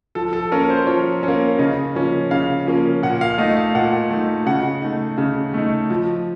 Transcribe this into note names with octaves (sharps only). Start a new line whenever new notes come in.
F3 A4
A4
A#3 C#4 A#4
C5
F3 C#5
C#4
A#3
C#3 D#5
F3 A#3 C#4
C#3 F5
F3 A#3 C#4
A#2 F#5
F5
A3 D#4 D#5
F5
A#2 F#5
A3 D#4
C#3 F#5
A3 D#4
C#3
A3 D#4
F3